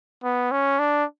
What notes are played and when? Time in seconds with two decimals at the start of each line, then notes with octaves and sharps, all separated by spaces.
0.23 B3
0.51 C#4
0.79 D4